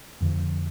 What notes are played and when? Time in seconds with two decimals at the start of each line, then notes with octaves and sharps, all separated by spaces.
0.21 F2 D3 F3